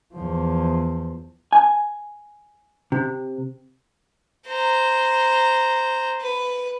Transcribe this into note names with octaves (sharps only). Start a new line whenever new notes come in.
E2 F3
G#5
C3
C5 A#5
B4